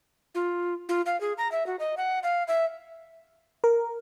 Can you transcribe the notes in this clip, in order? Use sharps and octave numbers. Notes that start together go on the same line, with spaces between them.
F4
F4
F5
G#4
A#5
E5
F#4
D#5
F#5
F5
E5
A#4